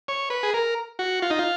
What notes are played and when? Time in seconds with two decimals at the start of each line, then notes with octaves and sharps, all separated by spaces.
0.08 C#5
0.30 B4
0.43 G#4
0.54 A#4
0.99 F#4
1.22 F4
1.30 D#4
1.39 F4